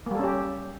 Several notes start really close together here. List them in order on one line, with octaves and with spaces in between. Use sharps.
A#3 G3 A4 C#4 G4